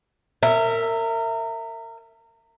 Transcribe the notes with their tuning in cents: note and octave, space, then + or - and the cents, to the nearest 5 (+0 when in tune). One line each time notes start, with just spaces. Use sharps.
A#4 -30 E5 +0